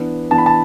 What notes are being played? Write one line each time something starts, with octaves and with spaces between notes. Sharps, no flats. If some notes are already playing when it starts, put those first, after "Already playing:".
Already playing: E3 B3 D4
E3 B3 D4 A5
B5
A5